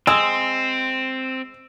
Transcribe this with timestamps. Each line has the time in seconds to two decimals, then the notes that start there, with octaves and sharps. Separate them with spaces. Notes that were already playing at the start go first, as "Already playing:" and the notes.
0.07 G#3 C4 E6